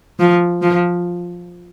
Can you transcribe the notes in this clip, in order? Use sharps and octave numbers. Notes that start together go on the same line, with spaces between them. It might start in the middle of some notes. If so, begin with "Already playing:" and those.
F3
F3